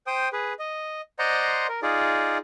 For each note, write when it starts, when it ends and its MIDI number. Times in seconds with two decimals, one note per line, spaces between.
0.07 0.29 72
0.07 0.29 79
0.07 0.29 87
0.33 0.53 68
0.33 0.53 71
0.59 1.01 75
1.19 1.67 72
1.19 1.67 74
1.19 1.67 75
1.19 1.67 78
1.19 1.67 82
1.19 1.67 84
1.69 1.80 70
1.82 2.38 63
1.82 2.38 65
1.82 2.38 68
1.82 2.38 74